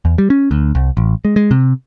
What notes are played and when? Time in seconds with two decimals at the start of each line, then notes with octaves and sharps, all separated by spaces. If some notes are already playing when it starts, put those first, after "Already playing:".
0.05 E2
0.18 G3
0.30 C#4
0.51 D2
0.75 C2
0.97 A1
1.25 G#3
1.36 G#3
1.51 C3